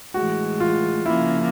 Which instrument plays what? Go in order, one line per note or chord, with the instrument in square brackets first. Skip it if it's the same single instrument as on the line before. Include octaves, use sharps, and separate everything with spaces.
[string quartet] A2 E3 G#3 [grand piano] F#4
[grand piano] F4
[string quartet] C#3 F3 A#3 [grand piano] E4